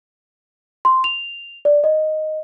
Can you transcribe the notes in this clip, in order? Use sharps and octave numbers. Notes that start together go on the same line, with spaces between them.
C6
F7
D5
D#5